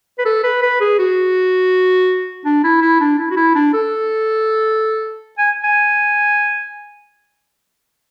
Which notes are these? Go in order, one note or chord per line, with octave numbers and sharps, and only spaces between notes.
B4
A4
B4
B4
G#4
F#4
D4
E4
E4
D4
E4
F#4
E4
D4
A4
G#5
G#5